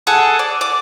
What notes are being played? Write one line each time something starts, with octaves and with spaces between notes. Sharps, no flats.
G#4 A4 F#5
D5
D5